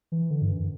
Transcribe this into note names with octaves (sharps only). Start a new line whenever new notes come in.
E3
D3
G2
F#2